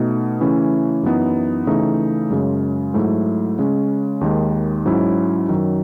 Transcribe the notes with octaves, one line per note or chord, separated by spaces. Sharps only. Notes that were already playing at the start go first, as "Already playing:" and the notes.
Already playing: B2 A3 D#4
C#3 E3 A3 C#4 E4
F#2 E3 B3 D#4
C#3 E3 A3 D#4
F#2 C#3 G#3
G#2 F#3 A3 E4
C#3 G#3 C#4
D#2 D#3 G#3
G#2 F#3 C#4 E4
F#2 D#3 F#3